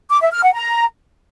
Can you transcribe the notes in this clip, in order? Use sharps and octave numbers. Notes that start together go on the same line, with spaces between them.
D6
E5
F6
F#5
A#5